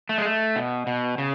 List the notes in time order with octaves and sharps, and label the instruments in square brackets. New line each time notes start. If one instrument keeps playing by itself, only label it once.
[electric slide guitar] A3
G#3
A3
B2
B2
C#3